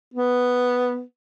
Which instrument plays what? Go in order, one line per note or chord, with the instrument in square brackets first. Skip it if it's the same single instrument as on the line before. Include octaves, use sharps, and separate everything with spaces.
[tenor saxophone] B3